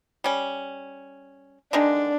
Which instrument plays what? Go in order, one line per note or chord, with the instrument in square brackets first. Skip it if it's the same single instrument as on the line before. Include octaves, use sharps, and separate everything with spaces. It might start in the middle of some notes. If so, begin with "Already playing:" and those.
[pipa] G3 C#4
[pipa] D3 D#3 G#3 [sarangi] D4